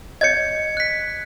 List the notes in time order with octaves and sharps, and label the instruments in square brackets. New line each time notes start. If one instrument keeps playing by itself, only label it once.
[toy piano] C#5 D#5 [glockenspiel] G#6 C#7
[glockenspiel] F#6 B6